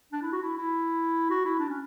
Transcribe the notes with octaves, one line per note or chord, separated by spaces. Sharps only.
D4
E4
F#4
E4
E4
F#4
E4
D4
C#4